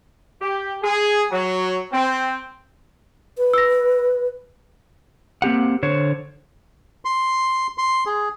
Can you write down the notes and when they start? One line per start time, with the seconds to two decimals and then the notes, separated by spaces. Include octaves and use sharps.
0.42 G4
0.83 G#4
1.31 F#3
1.92 C4
3.38 B4
3.54 E6 A#6
5.42 A#3 C4 G4 F#5
5.83 D3 C5 C#5
7.05 C6
7.78 C6
8.06 G#4